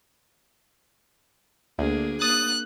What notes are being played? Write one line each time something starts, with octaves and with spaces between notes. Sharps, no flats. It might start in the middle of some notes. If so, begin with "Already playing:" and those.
D2 A#3 D4 G#4
A#3 D#6 F#6 A6